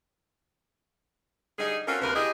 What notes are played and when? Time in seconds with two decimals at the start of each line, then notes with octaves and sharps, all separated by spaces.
1.59 D3 G3 D#4 G#4
1.88 C4 C#4 F4 F#4 A4 A#4
2.02 D2 C3 A#3 A#4 B4
2.15 A3 E4 G4 G#4 D#5